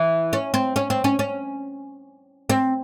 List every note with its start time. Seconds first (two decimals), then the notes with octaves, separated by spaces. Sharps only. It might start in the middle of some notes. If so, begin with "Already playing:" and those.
Already playing: E3
0.33 C#4
0.54 C4
0.76 C#4
0.90 C4
1.04 C#4
1.19 C#4
2.50 C4